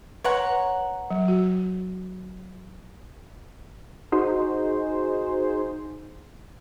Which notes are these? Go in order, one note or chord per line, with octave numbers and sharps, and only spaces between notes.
B4 C#5 F#5 A#5 C6
F#3
F#4
D#4 F#4 G#4 C5